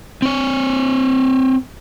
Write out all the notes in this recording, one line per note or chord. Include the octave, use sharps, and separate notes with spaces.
C4 C#5